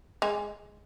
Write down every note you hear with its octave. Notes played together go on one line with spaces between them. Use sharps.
G#3 G#4